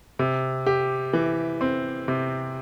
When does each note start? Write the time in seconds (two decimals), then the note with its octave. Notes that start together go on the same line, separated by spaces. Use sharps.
0.19 C3
0.67 G4
1.13 E3
1.61 C4
2.08 C3